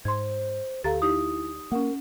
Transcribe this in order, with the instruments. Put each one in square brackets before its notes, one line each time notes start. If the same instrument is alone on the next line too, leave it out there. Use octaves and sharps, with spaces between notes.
[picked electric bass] G#2 [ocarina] C5 [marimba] C6 G#6
[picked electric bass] D2 [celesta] G4 [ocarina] A4 [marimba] F5 A#5 A6
[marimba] D#4 G4 [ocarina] E4 [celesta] D#6
[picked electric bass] A#3 [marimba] C#4 F#5 [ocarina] A#4